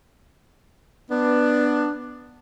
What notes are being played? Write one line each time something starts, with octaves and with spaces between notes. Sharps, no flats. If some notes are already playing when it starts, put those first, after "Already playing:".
B3 D4